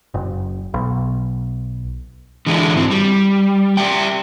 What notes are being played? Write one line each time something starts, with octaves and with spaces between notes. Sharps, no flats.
F#1
B1
D3 E3 G#3 A3 D4 E4
G#2 C4
G3
G4 D5 E5 G5